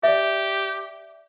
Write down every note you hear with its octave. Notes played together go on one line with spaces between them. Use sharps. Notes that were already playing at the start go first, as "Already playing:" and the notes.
G4 D5 E5